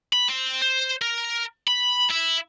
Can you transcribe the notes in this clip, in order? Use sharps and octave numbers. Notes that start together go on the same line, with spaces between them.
B5
C4
C5
A#4
B5
E4